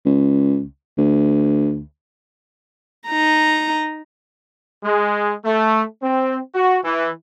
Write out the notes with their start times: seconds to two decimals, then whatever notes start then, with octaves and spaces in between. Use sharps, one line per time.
0.05 C#2
0.98 D2
3.08 D#4 A#5
4.84 G#3
5.45 A3
6.02 C4
6.55 F#4
6.84 E3